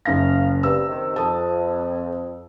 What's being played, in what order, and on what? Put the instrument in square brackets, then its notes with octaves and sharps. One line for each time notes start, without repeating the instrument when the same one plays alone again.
[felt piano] F#1 F#2 A#6 [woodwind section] F5
[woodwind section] G2 C3 [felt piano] E6
[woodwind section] C3 D#3
[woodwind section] F2 [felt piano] A5 D#6